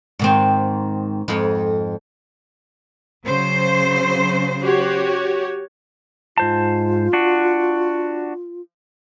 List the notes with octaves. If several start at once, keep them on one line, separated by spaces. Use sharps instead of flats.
G#2 D#3 C4
F2 G#2
C#3 F#3 C5
F#4 G4 C#5
G#2 F4 C5 A5
D4 F#4